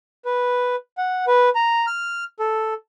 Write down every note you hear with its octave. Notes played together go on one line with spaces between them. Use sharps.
B4
F#5
B4
A#5
F6
A4